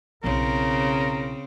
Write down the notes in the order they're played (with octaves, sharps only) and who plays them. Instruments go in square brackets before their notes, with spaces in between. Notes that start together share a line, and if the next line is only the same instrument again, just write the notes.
[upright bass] B1 E4 [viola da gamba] C#3 C4 [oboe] A#4